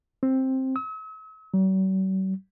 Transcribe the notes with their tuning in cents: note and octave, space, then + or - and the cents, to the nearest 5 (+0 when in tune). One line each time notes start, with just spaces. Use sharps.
C4 +10
E6 -45
F#3 +45